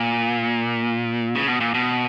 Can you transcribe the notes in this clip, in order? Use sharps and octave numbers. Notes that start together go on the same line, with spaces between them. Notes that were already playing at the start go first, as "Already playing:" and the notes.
Already playing: A#2
C#3
B2
A#2
B2